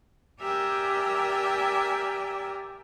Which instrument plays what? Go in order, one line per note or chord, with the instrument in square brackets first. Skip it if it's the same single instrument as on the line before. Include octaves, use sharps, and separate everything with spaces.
[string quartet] G4 A#4 D5 E5 G5 G#5